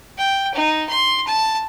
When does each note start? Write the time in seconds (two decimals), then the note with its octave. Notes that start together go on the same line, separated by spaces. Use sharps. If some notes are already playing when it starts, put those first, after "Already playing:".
0.18 G5
0.55 D#4
0.89 C6
1.27 A5